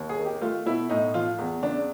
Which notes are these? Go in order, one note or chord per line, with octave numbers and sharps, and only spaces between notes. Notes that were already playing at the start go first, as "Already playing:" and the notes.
Already playing: D#2
G#4
D#3
G4
A3 F4
B2 E4
A2 D#4
F3 F4
E2
C#3 D4